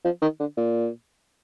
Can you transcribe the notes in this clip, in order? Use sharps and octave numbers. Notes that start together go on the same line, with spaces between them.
F3
D#3
D3
A#2